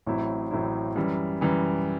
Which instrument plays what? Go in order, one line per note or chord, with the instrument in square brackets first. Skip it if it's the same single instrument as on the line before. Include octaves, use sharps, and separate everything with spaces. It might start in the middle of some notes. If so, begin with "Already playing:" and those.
[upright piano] A1 A2 F#3 C4 E4
A1 A2 F#3 C4 E4
F#2 E3 G3
F#2 E3 G3